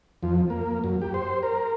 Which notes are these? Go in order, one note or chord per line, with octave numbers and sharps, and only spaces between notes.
F2
A#3
F#2
G4
C5
A#4